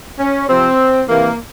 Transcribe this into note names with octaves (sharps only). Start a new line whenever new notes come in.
C#4
C3 F3 C4
C3 E3 A#3